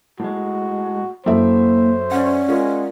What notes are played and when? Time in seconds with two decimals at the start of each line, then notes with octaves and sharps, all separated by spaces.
0.20 A2 G#3 F#4
1.26 F#2 A#3 E4 A4 C5 E5 G5
2.12 C#4 D5 F#5
2.48 G#3 F4 A#4